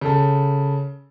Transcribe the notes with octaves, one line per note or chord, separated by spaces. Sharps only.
C#3 A4 A5